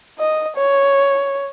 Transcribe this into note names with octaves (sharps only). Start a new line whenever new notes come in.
D#5
C#5